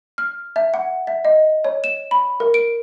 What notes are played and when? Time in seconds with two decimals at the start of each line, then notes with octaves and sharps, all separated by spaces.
0.18 F6
0.56 E5
0.74 F#5
1.07 E5
1.25 D#5
1.65 C#5
1.84 E7
2.11 B5
2.40 A#4
2.54 D7